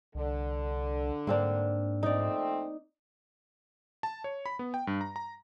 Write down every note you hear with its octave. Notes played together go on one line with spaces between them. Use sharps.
C2 D3
G#2 A#3 C4 D4
F2 A3 C4 D#4 D5
A5
C#5
B5
B3
G5
G2
A#5
A#5